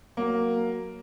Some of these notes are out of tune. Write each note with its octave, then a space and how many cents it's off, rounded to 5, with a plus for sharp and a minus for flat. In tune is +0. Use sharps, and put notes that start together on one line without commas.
F#3 +0 A#3 +0